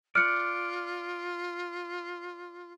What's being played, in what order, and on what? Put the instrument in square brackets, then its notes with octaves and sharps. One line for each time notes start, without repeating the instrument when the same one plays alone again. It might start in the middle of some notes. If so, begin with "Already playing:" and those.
[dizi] F4 [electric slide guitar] D5 [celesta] F6 F#6 C#7